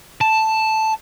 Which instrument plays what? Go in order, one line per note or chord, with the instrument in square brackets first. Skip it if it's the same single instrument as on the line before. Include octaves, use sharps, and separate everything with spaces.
[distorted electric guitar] A5